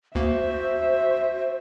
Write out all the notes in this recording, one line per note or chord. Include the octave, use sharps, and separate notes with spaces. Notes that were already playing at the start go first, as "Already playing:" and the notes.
D2 A#3 F#4 C5 E5